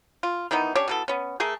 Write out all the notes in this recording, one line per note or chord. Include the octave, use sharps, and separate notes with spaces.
F4
D#3 E3 B3 D#4
C#4 D4 G4 C#5
B2 E3 A4
B3 C#4
A3 G#4 A#4